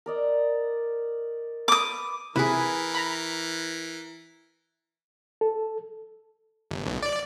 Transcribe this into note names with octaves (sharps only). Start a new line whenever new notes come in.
A#4 D5 D#5
B4 D6 D#6
C3 E3 E4 G#4 A#4 B4
A#5 B5
A4
G1
B1
D5